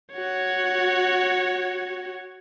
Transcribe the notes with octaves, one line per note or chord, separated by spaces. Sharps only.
F#4 C#5